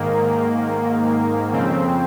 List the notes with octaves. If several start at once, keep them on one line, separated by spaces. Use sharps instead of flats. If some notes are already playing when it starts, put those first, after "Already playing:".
Already playing: G#2 D#3 A#3
F2 C#3 C4